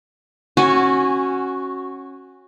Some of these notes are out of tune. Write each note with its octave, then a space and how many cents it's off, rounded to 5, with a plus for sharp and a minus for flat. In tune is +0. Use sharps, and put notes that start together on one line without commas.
C#4 -20 F#4 +0 G#5 +0